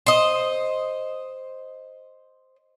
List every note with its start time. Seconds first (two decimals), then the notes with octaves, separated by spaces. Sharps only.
0.06 C5 D#5